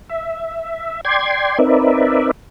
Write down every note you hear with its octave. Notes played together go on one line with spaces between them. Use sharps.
E5
D5 G5 C6 G#6
C4 D#4 A#4 B4 D5 E5